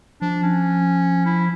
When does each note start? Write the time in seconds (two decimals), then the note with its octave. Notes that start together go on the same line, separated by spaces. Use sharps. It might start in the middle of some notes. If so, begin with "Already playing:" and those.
0.22 F3 D4
0.43 C#4
1.25 E4